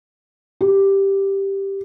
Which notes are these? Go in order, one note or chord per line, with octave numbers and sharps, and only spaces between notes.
G4